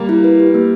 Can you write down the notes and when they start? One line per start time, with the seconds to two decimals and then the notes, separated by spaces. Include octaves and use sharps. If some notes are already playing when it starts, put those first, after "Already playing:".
Already playing: G3 A#3
0.09 E4
0.24 B4
0.40 G4
0.54 A#3